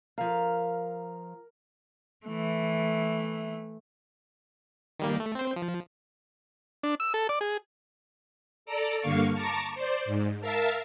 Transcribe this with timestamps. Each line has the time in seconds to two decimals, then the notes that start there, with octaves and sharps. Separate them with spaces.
0.18 F3 A#4 F5
2.25 E3 A3
4.99 D#3 G3 A#3
5.20 A3
5.35 C4 C5
5.56 F3
6.83 D4
7.00 E6
7.14 A4
7.29 D5
7.41 G#4
8.66 A4 D5 A#5 D6
9.01 G2 D3 A#3 F5 C#6
9.34 A5 A#5 C#6 D6
9.75 C5 D5
10.05 G#2
10.41 A#4 E5 F5 A5